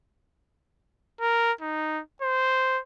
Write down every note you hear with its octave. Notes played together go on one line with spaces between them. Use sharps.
A#4
D#4
C5